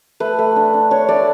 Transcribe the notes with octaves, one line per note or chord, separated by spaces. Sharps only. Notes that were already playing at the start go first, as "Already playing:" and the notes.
A3 B4
A3
D4
D4
D4 C#5
A3 D5